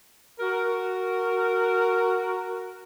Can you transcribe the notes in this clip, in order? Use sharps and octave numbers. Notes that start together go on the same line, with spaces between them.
F#4 A#4